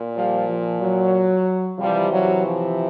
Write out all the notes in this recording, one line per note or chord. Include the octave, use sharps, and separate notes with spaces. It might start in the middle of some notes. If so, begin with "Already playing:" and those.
Already playing: A#2
F3 G3
F3
F#3
C3 E3 F3 G3
F#3
F3